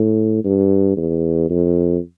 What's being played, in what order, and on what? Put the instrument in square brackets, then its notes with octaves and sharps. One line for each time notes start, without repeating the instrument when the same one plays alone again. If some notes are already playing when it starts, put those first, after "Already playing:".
Already playing: [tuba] A2
G2
E2
F2